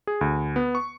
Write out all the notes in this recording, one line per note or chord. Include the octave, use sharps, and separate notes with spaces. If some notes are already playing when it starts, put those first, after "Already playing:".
G#4
D2
B3
C#6